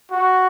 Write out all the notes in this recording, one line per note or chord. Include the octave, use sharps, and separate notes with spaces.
F#4